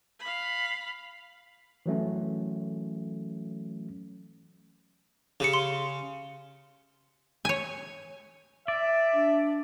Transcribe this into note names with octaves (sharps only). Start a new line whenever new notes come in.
F5 B5
E3 F#3 A3 C#4
C#3 G4 C#7
C6
C#5 G#5
D5 E5
D4